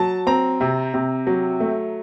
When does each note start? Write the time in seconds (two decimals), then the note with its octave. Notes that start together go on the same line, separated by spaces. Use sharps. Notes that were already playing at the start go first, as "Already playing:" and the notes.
Already playing: F#3 A5
0.27 C4 A#5
0.61 C3
0.94 C3
1.27 F#3
1.60 A3